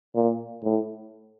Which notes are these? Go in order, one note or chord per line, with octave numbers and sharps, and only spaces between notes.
A#2
A2